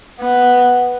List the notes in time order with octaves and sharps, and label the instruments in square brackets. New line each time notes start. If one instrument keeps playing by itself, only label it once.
[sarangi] B3